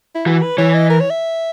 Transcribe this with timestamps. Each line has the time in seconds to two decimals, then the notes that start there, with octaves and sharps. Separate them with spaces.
0.15 E4
0.27 E3 F#4
0.43 B4
0.58 E3 C#5
0.74 D#5
0.90 A#4
1.00 C#5
1.10 E5